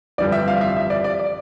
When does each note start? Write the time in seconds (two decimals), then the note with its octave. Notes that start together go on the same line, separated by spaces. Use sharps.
0.18 G1 F2 E3 G3 D5
0.32 E5
0.48 F5
0.61 E5
0.77 E5
0.90 D5
1.04 D5
1.19 D5